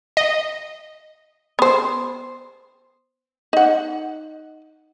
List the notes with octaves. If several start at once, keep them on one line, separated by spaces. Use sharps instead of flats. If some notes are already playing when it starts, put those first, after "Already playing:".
D#5
B3 C5
D#4 F#5